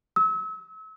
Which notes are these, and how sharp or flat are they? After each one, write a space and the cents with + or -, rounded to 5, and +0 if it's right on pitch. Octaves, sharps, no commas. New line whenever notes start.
E6 -35